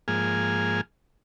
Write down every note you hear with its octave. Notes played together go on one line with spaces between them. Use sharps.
G#2 F3 A#3 G#4 G#5 F6